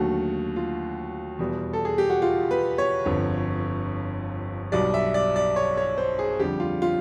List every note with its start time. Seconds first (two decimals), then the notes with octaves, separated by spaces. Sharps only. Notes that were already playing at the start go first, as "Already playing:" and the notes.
Already playing: D#2 D3 F#3 A3 F#4
0.56 F4
1.39 E2 B2 G3
1.73 A4
1.85 G#4
1.98 G4
2.10 F#4
2.22 F4
2.51 B4
2.78 C#5
3.06 G1 F2 D3
4.72 B1 B2 G3 D5
4.94 E5
5.14 D5
5.36 D5
5.56 C#5
5.77 C#5
5.98 C5
6.19 G#4
6.39 F2 D3 G3 G4
6.60 F4
6.82 F4